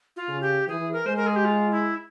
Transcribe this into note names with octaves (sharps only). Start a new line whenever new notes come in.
F4
C#3
G4
E3 G#4
A#4
G#3 C5
A#4
G#4
G4
F4
E4